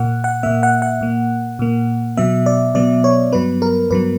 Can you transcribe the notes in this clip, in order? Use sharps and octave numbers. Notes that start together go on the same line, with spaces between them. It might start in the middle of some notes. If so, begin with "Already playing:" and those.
Already playing: A#2 A#3 F#5
F#5
A#2 A#3 E5
F#5
F#5
A#2 A#3
A#2 A#3
B2 F#3 B3 E5
D5
B2 F#3 B3 D5
C#5
G2 F#3 B3 B4
A#4
G2 F#3 B3 B4